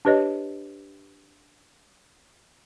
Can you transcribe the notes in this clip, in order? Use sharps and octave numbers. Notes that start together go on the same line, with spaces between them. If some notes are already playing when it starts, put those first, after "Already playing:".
D4 G4 B4 C#5 D#5